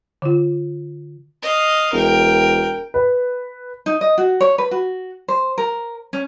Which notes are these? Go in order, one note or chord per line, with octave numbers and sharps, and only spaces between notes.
D3 F4
D#5 F5
E1 A#4 G5
B4
D#4
D#5
F#4
C#5
B4
F#4
C5
A#4
C#4